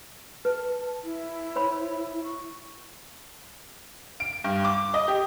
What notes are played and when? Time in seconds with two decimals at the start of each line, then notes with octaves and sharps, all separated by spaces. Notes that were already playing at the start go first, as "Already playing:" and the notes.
0.45 B4 A5
1.04 E4
1.56 C5 C#5 B5
2.24 C#6
4.20 D7
4.44 G2
4.65 D6
4.94 D#5
5.08 G4